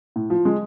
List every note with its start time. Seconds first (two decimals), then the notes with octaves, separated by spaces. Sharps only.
0.16 A2
0.30 F3
0.45 G#3